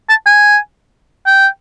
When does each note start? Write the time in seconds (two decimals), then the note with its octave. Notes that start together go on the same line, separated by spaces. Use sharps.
0.09 A5
0.26 G#5
1.26 G5